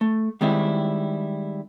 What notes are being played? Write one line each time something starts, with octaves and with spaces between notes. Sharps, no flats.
A3
D#3 G3 G#3 C4 E4